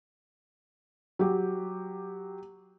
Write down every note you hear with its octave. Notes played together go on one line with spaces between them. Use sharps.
F#3 G4